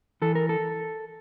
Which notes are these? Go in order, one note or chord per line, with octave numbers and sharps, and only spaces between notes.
E3 A4
A#4
A4